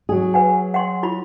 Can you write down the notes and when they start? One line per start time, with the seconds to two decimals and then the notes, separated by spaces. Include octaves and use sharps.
0.09 F#3 G#4
0.34 B4 F#5 G#5
0.74 F#5 G5 C6
1.03 E4 F4 B5